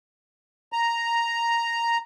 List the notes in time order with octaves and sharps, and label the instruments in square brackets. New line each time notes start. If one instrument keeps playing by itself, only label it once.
[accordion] A#5